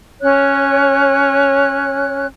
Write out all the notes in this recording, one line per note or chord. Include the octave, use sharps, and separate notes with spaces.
C#4 C#5 F#6